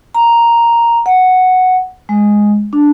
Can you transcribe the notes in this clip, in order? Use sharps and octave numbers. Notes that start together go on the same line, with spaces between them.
A#5
F#5
G#3
D4